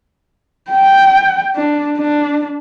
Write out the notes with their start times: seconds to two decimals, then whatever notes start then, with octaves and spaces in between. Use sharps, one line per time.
0.70 G5
1.56 D4
1.98 D4